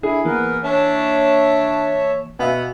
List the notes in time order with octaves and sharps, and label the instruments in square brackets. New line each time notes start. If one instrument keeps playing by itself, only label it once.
[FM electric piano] D4 [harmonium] E4 [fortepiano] G#4
[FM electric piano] E3 A#3 [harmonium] B3 A#4 B4
[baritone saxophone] D4 [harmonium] C#5 E5 A5
[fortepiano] B2 [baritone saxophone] B3 [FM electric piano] E5 F5 G#5